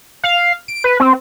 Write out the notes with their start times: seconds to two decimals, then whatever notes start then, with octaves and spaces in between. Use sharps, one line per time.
0.24 F5
0.68 D7
0.84 B4
1.00 C4